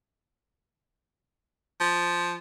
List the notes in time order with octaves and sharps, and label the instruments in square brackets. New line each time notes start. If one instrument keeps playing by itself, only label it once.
[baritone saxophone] F3